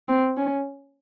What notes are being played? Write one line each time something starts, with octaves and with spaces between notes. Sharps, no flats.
C4
C#4